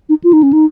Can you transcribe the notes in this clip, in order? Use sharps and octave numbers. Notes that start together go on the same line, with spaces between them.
D#4
F4
D#4
C#4
D#4